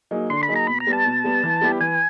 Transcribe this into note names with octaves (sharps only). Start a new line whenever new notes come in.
F#3 A#3 D#4 G#4
D3 C6
B5
F#3 A#3 D#4 G#4
A#5
B2 B5
A#5
G3 B3
A5
B2
G3 B3
E3
G3 B3 E4 G4
E3 G#5